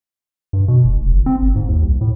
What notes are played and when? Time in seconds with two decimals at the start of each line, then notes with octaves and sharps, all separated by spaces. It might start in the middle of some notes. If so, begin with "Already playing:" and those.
0.53 G2
0.68 B2
0.84 F1
0.97 F1
1.12 G1
1.26 C4
1.42 G1
1.56 G#2
1.69 D#2
1.83 C2
2.01 A2